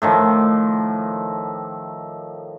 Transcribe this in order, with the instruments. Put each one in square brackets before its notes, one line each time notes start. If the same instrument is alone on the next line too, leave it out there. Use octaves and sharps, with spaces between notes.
[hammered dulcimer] A2 D#3 F3